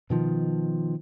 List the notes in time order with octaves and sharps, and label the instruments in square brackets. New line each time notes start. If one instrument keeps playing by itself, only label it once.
[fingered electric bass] B2 D#3 F3